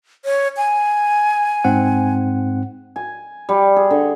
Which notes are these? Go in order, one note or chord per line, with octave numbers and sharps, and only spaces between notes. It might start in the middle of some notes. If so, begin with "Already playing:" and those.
C#5
G#5
G#2 C4 F#5
G#5
G3
G#4
D3